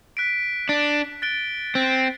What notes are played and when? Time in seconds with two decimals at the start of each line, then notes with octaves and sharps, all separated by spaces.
0.17 F#6 B6 D7
0.69 D4
1.22 F#6 A6 D7 G7
1.75 C4